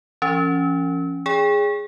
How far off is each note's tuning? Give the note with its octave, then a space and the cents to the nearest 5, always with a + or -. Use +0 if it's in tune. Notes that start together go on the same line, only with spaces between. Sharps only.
F3 -40 C#4 +0
G#4 -5 C#5 +40 G5 +30